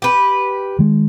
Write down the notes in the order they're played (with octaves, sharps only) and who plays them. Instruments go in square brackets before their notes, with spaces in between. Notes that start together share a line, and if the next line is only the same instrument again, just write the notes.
[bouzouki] G4 B4
[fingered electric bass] D#3 G#3